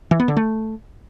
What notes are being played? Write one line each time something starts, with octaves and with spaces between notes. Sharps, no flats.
E3
B3
D3
A3